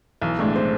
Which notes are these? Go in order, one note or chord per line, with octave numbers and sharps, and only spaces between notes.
B1 E3
A2 G#3 A3 D4
C4